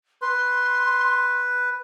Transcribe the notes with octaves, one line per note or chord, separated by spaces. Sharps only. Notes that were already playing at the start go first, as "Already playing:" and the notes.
B4 C6